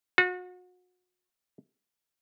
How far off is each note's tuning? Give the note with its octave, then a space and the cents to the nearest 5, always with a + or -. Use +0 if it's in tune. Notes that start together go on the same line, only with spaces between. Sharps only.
F#4 -35